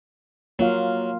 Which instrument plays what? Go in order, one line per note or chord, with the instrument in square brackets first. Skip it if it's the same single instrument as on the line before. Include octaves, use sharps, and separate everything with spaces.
[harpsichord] F#3 [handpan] A#3 F4 F5